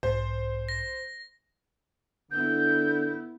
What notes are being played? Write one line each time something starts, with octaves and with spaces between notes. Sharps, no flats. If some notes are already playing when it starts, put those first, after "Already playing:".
B1 G#2 C5
A#6
D3 B3 E4 G6